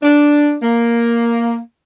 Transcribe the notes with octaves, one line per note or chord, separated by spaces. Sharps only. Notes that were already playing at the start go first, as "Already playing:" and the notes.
D4
A#3